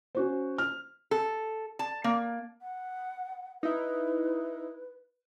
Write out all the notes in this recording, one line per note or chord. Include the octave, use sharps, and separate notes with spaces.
C#4 F#4 C5
F6
A4
A5
A#3
F#5
D#4 E4 B4